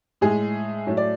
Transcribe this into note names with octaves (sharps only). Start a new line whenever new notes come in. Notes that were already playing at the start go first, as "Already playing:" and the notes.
A2 G#3 G#4
A2 F#3 A3
D5